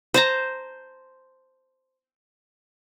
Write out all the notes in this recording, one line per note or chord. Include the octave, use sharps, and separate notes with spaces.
C5 A5 A#5